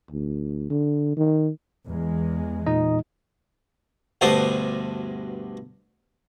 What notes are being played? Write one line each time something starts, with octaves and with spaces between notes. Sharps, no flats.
D2
D3
D#3
E2 G#3
A#2 D#4 D#5
D2 G2 B2 D4 C5 A5